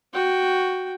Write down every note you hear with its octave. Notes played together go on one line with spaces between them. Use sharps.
F#4 G5